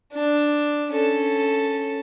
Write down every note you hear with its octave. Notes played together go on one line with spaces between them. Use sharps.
D4
C#4 A4